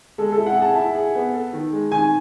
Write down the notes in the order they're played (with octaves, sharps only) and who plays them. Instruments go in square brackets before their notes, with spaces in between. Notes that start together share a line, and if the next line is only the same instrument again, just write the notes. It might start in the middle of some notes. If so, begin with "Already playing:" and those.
[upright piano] G#3 [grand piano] A4
[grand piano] A4
[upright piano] E4
[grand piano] F#5
[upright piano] G#4 [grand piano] A5
[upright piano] E4 [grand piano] A5
[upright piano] G#4
B3
A4
D#3
G#3
[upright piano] D#3 [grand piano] G#5